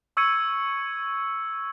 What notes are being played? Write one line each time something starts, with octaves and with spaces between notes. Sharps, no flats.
C#6 E6 G#6 C#7 D#7